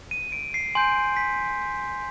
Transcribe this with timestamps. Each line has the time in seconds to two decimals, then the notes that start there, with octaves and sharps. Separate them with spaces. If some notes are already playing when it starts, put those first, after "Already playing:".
0.11 D#7
0.32 D7
0.54 C7
0.75 G#5 C6 G6
1.17 B6